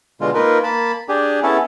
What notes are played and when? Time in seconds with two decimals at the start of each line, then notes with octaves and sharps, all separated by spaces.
0.21 B2 D3 G#3 F4
0.34 A#3 D#4 F4 A#4 B4
0.63 A#3 A5 B5
1.09 D4 G4 G#4
1.43 B3 C#4 E4 G#4 A4